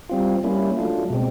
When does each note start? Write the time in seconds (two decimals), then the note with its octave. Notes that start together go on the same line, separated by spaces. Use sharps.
0.09 G3 C4 F4
0.43 G3 A#3 C#4 E4
0.77 F#3 A3 D4 F4
1.10 B2 G#3 C4